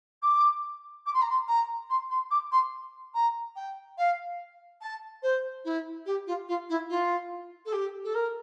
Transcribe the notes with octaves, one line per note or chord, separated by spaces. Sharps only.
D6
D6
C6
A#5
C6
A#5
C6
C6
D6
C6
A#5
G5
F5
A5
C5
E4
G4
F4
F4
E4
F4
A4
G4
A4
A#4